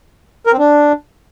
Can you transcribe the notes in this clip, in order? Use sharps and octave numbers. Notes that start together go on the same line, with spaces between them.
A#4
C4
D4